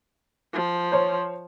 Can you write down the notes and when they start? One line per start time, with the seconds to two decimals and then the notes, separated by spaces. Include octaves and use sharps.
0.53 F3
0.92 C5 C#5